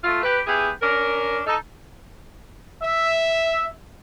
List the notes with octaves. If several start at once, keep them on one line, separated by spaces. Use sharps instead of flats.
A3 F4
G4 B4
B3 E4 G4 G#4
C#4 D4 A#4
D#4 A4
E5